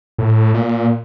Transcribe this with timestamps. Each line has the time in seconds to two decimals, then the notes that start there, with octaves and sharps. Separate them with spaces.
0.18 A2
0.54 A#2